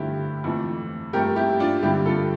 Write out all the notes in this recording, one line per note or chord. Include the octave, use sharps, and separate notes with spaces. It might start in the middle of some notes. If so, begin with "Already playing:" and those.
Already playing: G2 D3 F3 A3 E4 G4
F2 E3 A3
G2 F3 A3 G4 A#4
E4 G4
D4 F4
G2 D3 G3 E4 G4
F4 A4